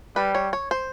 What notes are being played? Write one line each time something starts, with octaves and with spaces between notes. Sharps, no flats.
G3 B4
C#5
C#5
C5